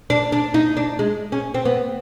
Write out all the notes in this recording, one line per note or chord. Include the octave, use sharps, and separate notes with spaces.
D4
D4
D#4
D4
G#3
C#4
C4
B3